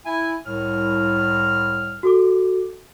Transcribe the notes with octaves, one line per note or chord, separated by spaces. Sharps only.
E4 G#5
C2 A2 F6
F#4 A4 D6